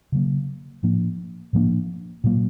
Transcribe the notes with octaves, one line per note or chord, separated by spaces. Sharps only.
C#3 F#3 A#3
A2 F3 A#3 D4
A2 F3 A#3 D4
A#2 F#3 A#3